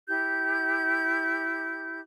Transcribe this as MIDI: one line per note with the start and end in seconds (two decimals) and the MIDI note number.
0.08 2.00 64
0.08 2.00 67
0.08 2.00 91